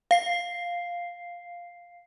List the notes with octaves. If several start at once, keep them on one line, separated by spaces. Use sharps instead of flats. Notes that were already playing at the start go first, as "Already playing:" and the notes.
F5 C7